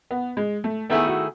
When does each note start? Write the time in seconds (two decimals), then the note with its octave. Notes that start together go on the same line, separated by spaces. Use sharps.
0.11 B3
0.37 G#3
0.64 A3
0.90 D#3 A3 B3 E4 G#4
1.07 F#4